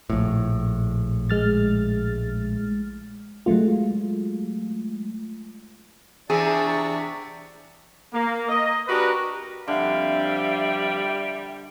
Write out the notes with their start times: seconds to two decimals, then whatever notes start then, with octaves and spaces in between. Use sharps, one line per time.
0.10 A#1 A2
1.30 G#3 F6 A6
3.46 F#3 G#3 A3 F4
6.30 E2 C3 C4 D4 G#4 E5 A5 C#6
8.13 A#3
8.49 D#5
8.88 D4 F#4 G4 A#4 B4
9.68 F2 D3 G3 E5 F5